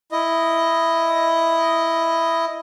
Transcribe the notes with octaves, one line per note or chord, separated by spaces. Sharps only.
E4 D#5